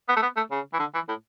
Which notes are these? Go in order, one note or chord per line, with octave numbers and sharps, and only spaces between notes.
B3
A3
B3
A3
C#3
E3
D3
E3
A2